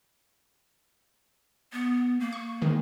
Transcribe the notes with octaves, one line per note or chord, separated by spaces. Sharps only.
B3
A#3
C#6
D#3 G#3